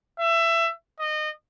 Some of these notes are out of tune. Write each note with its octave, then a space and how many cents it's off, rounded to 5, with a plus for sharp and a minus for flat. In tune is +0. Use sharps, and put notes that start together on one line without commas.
E5 +20
D#5 -25